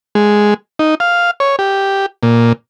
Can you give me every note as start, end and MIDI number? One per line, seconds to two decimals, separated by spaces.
0.15 0.54 56
0.79 0.95 63
1.00 1.31 77
1.40 1.56 73
1.59 2.06 67
2.23 2.53 46